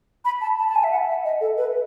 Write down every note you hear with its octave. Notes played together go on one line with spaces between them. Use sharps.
B5
A5
A5
A5
G#5
E5
F#5
E5
D#5
A4
B4